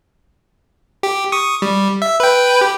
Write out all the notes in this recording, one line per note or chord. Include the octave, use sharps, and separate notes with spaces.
G4
C#6 D#6
G3
E5
B4 G5
G4